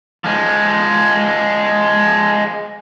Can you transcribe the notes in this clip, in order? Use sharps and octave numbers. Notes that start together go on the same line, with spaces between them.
F3 G#3